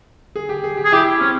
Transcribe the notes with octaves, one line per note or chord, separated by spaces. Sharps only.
G#4
G4
G#4
G4
G#4
E4 G4
C4 C#4